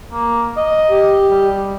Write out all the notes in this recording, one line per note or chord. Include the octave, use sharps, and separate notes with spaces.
A#3
D#5
G4
G3